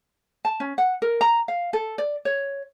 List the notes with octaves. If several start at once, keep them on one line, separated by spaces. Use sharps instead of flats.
A5
C#4
F#5
A#4
A#5
F5
A4
D5
C#5